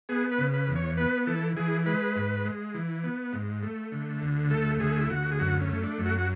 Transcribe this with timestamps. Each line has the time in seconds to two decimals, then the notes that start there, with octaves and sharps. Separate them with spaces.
0.09 B3 G#4
0.31 B4
0.38 C#3
0.53 B4
0.68 E2
0.75 C#5
0.97 B3 B4
1.27 E3 A4
1.57 E3 G#4
1.86 G#3 B4
2.16 G#2
2.45 G#3
2.74 E3
3.04 B3
3.33 G#2
3.63 A3
3.92 D3
4.21 D2
4.51 A3 A4
4.80 D2 G#4
5.01 E4
5.10 D2 F#4
5.31 G#4
5.39 F#2 F#4
5.61 C#4
5.69 A3
5.83 D4
5.98 F#2
6.06 F#4
6.18 F#4